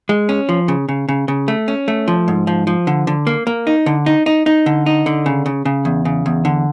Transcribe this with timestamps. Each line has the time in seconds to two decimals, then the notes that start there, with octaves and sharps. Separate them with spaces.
0.09 G#3
0.29 C#4
0.49 F3
0.68 C#3
0.89 C#3
1.09 C#3
1.28 C#3
1.48 A3
1.68 C#4
1.88 A3
2.08 F3
2.28 G#2
2.47 F3
2.67 F3
2.87 D3
3.07 D3
3.27 A#3
3.47 A#3
3.67 D#4
3.86 D3
4.06 D#4
4.26 D#4
4.46 D#4
4.66 D3
4.86 D#4
5.06 D3
5.26 C#3
5.46 C#3
5.65 C#3
5.85 E2
6.05 C#3
6.26 E2
6.45 D3